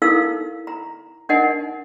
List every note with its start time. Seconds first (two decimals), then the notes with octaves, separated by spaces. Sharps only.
0.02 D#4 E4 A4 A#4 F5 E6
0.67 A#5
1.29 D4 D#4 A#4 D#5 F#5 G#5